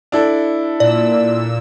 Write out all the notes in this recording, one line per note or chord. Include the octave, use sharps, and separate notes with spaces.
D4 E4 A4
A#2 D5 E6